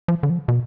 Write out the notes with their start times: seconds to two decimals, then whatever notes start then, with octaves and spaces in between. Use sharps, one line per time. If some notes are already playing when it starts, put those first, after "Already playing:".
0.08 F3
0.23 D3
0.30 F3
0.48 B2